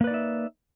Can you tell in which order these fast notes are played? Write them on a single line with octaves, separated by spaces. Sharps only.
A#3 B4 D5 D#4 E5